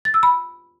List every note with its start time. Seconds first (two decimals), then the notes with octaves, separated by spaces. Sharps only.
0.05 A6
0.14 E6
0.23 B5